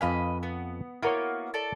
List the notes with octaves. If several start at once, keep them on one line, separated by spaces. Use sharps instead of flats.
F2 B4 D#5 F5 G#5 B5
B3
A#3 B3 E4 F#4 A#4 C#5
A4 D5